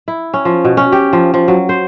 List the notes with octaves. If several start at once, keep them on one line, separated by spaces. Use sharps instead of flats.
E4
C#4
F3
B2
C#4
G4
F3
F3
F#3
C5